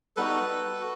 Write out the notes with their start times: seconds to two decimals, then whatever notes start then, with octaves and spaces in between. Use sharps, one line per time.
0.17 G3 B3 D#4 F#4 A4 B4
0.80 F#4